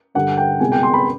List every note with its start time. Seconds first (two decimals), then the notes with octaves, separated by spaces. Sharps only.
0.15 G2 D3 G3 F#5
0.37 G5
0.60 C2 B2 G#3 G#5
0.72 G5
0.83 C6
0.94 B5